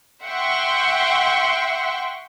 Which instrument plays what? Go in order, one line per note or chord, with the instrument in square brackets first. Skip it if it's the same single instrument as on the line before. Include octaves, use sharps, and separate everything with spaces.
[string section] E5 F#5 G5 C6 C#6